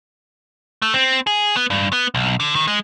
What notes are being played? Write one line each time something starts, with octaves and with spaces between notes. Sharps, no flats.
A3
C4
G#4
B3
G2
B3
B1
D3
D#3
G#3